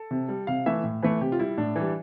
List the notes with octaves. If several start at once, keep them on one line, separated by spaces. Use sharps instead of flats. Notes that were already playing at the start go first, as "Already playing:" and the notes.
Already playing: A4
C3
G3
C3 F5
E3 A3 E5
A2
E3 A3 B4
C3 G4
F4
G3 E4
A2 D4
E3 G3